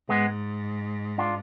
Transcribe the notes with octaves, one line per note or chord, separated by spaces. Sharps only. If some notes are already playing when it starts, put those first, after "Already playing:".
G#2 G#3 B3
D4 F4